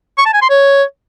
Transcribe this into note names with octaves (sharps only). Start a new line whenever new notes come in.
C#6
A5
G#5
C6
C#5